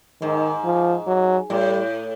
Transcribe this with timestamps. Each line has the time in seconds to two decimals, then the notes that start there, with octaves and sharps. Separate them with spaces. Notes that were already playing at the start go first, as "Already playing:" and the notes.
0.22 G#2 D#3
0.65 F3
1.07 F#3
1.50 A2 G3